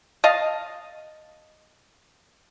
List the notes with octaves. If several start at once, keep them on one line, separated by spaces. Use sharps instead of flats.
D#5 F5 A5